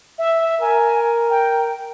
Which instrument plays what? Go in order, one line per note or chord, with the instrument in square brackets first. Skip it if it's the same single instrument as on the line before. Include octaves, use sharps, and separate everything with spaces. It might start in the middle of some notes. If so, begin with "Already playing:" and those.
[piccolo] E5
[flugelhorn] A#4 [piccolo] G#5
[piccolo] G5